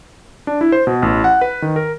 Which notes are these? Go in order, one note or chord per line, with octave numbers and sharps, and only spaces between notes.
D4
E4
C5
B2
A1
F#5
B4
D#3
A#4